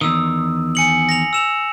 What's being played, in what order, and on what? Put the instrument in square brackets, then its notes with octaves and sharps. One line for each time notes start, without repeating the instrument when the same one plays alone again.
[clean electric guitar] E2 D#3 [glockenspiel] D#6 E6
[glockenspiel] G#5 C#7 F#7
A#6 F7
E6 E7 F7